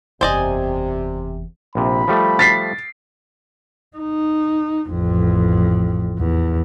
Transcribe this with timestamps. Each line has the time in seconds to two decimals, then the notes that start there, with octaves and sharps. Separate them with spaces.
0.21 F#1 E2 C3 C5 D5 D#5 G#5
1.75 A#1 C3 B5
2.08 F3 G3 A3
2.39 A6 B6 C7
3.97 D#4
4.90 A1 F2
6.18 E2